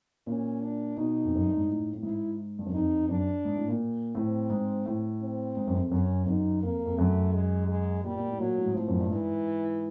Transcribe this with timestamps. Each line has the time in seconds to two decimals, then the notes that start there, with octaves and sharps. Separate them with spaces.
0.27 A#2 C#4
0.62 D4
0.97 B2 D#4
1.25 F2
1.35 F#2
1.47 G2
1.57 G#2
1.68 A2
1.93 A2
2.03 G#2 E4
2.59 G2
2.66 F#2
2.74 F2 D#4
3.09 F#2 D4
3.45 G#2
3.56 A2
3.68 A#2
4.15 A2 C4
4.50 G#2
4.86 A2
5.21 C4
5.57 G#2
5.67 F#2
5.75 F2
5.91 F#2 C#4
6.27 F#2 D#4
6.62 F2 A#3
6.85 F2
6.98 F#2 A3
7.33 G#3
7.68 G#3
8.04 A#2 G3
8.16 A#2
8.28 A2
8.39 A#2 F#3
8.57 A2
8.66 G#2
8.75 A2 F3
8.88 F#2
8.99 G2
9.09 G#2 E3